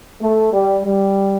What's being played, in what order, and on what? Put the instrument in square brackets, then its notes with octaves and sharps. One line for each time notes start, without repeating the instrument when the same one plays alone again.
[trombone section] A3
G3
G3